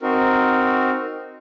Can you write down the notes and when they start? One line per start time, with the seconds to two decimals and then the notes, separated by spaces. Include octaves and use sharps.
0.01 C4 D#4 F#4 A#4